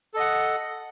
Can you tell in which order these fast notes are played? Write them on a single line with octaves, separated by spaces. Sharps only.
A4 D#5 F#5